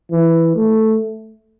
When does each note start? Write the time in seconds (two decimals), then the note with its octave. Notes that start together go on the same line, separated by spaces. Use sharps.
0.11 E3
0.56 A3